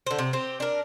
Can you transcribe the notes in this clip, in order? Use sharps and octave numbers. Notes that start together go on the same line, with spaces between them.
D3 C5
C3
C4 G4
D4 A#4